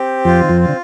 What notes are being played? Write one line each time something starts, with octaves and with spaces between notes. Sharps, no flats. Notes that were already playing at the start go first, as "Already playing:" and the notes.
Already playing: C4 G4
F2 F3 F4
D#3
F2 F3
F4
D3